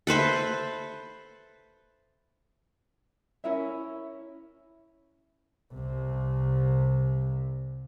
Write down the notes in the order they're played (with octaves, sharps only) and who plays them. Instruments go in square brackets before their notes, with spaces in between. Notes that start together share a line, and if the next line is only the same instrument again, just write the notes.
[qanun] A4 B4 C5 E5
[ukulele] C#4 E4 A#4 E5
[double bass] C2 C3